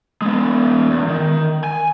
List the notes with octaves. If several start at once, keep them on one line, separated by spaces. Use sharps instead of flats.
G#3 B3
E2
D#3
G#5